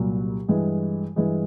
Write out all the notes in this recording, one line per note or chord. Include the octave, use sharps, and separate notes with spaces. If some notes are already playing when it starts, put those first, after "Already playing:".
Already playing: C2 A#2 F#3
G2 E3 G#3
G2 E3 G#3